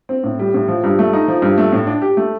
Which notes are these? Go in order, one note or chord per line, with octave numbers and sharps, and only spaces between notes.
C4
A2
G3
A2
F3
G2
A3
D#4
F3
G2
A3
A2
D4
G4
A3